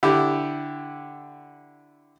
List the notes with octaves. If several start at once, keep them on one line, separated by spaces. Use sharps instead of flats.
D3 E4 G4